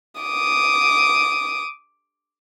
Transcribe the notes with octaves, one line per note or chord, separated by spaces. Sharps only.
D6 D#6